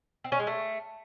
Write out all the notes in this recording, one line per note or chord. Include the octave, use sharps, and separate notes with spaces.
C4
C#4
G#3
A3